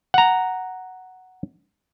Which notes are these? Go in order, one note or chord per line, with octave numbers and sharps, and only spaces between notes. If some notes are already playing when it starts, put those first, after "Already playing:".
F#5 A#5